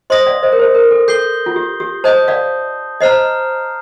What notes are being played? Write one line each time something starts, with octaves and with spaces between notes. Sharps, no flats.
C5 D#5 C6 D#6 A#6
D5 F5
C5 D#5
A#4
C5
A#4
A4
A4 G6 C7 G7
F4
G4
G4
C5 D#5 A5 D#6 G6
D5 F5
C5 D#5 A#5 F6 C7